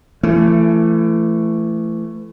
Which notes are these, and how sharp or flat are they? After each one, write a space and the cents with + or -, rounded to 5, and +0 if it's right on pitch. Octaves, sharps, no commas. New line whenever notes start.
E3 +35 A3 +10